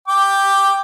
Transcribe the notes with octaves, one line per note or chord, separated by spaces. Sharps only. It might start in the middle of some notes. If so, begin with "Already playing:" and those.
G5 D6